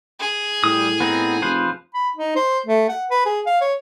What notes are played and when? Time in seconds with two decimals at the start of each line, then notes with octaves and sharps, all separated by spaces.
0.19 G#4
0.64 A2 G3 D#6
1.00 B3 C4 D#4
1.42 F1 F3 B4 C5
1.94 B5
2.16 D#4
2.36 C5
2.66 A3
2.89 F#5
3.10 B4
3.26 G#4
3.47 F5
3.61 C#5